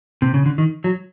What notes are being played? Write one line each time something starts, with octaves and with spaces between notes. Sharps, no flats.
C3
C#3
D3
D#3
F#3